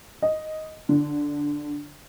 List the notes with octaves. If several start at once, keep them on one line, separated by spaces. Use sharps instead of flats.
D#5
D3